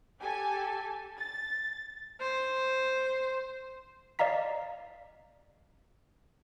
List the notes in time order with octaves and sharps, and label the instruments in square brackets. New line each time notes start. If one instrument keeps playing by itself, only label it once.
[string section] G4 A4 G#5
A6
[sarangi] C5
[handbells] D5 D#5 F5 A#5 B6